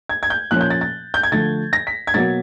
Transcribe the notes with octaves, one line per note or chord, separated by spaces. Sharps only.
G#6
G#6
G6
A#2 F3 A#3 C#4 F#6
G6
A6
A6
G6
G#6
D3 F3 A3 A6
A#6
B6
G#6
B2 F#3 A#3 A6